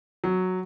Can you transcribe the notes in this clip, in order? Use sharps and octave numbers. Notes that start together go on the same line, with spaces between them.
F#3